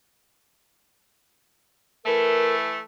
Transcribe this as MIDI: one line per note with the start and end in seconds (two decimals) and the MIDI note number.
2.06 2.80 52
2.06 2.80 57
2.06 2.55 70